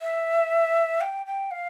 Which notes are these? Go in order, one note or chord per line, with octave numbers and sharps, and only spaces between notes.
E5
G5
G5
F5